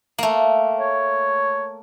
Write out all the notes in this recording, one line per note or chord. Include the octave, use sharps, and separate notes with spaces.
A3 A#3
C#5